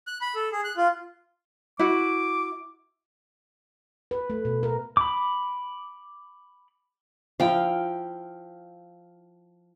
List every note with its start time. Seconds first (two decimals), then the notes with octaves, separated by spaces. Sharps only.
0.07 F#6
0.21 B5
0.35 A4
0.52 G#4
0.64 F#6
0.77 F4
1.79 E4 F#4 D6
4.11 B4
4.30 A3
4.45 B2
4.63 A#4
4.97 B5 D6
7.40 F3 E4 F5 G5